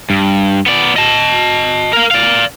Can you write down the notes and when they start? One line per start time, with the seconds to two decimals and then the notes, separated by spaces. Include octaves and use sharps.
0.10 G2
0.66 B3 D5
0.96 D#5 A5
1.93 A#4 F5
2.11 D5 F5